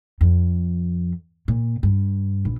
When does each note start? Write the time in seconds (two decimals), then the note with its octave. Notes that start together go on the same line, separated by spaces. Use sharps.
0.21 F2
1.48 A#2
1.83 G2
2.45 A#1